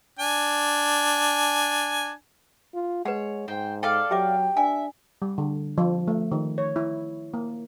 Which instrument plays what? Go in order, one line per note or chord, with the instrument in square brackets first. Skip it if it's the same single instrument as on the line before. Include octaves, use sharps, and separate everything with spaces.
[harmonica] D4 G#5
[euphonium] F4
[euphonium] G#3 [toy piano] B4 F#5 [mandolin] C#5
[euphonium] G#2 [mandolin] C5 G5
[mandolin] A4 D5 F5 [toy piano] G5
[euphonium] F#3 [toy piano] G4 E5 D6 [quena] G5
[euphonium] D4 [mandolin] E5 [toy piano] G#5
[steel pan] G3
D3
F3
A3
D#3
C#5
E4
A#3